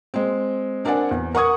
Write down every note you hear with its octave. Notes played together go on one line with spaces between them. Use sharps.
G#3 C4
C4 D4 A#4 D5 F#5 G#5
E2
A#4 F#5 C#6 D#6 G#6